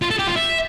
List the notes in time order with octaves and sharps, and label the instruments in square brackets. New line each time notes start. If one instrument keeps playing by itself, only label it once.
[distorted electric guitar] F4
A4
G4
F4
E5